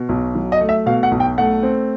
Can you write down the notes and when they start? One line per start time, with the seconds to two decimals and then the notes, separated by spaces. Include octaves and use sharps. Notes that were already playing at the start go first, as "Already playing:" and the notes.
Already playing: B2
0.09 B1
0.35 F#3
0.52 D#5
0.61 A3
0.69 E5
0.86 B2 F5
1.03 F#5
1.11 B1
1.20 G5
1.38 A3 F#5
1.63 C4